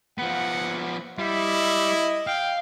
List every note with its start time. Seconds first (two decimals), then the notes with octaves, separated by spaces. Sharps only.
0.18 F3 B3 F#5
1.19 G3 E4 D#5
2.27 F5 G5